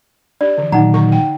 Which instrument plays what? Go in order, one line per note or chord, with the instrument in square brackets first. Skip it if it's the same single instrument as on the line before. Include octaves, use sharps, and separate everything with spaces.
[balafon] D4 G4 [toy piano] D5
[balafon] D3 E3
[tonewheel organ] A#2 D#3 F#3 [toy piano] D#4 F#5 A#5
[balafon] D3 C#6
G5